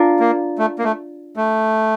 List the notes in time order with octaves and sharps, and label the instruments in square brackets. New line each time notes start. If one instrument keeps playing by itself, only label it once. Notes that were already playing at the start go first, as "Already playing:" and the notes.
Already playing: [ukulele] D4 F4 A#4
[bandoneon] A#3
A3
A#3
A3
A3